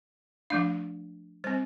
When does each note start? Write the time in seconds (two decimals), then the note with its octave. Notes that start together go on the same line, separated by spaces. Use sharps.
0.50 F3 A3 D4 F5
1.44 G3 C5
1.47 C4